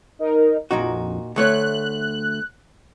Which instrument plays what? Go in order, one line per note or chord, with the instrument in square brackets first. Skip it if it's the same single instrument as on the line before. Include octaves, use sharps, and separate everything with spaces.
[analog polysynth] D#4 A#4
[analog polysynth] A#1 F2 [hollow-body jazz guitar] A#2 D#4 F#4
[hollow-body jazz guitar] D2 A3 C#5 [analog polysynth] F#6